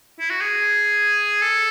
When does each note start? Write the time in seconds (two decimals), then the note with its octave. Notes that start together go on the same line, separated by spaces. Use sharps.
0.20 E4
0.30 F#4
0.41 G#4
1.42 A4